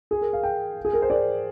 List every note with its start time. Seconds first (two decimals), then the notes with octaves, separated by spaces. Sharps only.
0.11 G#4
0.21 A#4
0.33 F5
0.43 G5
0.85 G#4
0.93 A#4
1.02 C5
1.10 D5